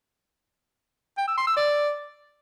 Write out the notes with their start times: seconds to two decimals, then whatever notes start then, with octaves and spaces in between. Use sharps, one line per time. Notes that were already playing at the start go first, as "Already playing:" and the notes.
1.18 G5
1.27 E6
1.37 C6
1.47 E6
1.57 D5